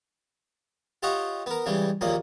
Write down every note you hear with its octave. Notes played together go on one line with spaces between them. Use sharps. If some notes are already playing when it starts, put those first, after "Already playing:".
F4 G4 C#5 D#5 F#5
B3 A#4
C#3 E3 G3 G#3
A#1 D#2 A#2 A#3 C#4 D#6